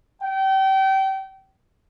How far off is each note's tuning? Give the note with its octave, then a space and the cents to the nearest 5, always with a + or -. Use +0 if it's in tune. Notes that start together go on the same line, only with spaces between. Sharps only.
G5 -30